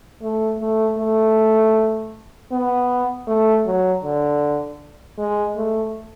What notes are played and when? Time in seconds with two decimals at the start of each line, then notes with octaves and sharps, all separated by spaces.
0.22 A3
0.60 A3
0.98 A3
2.52 B3
3.27 A3
3.66 F#3
4.03 D3
5.18 G#3
5.56 A3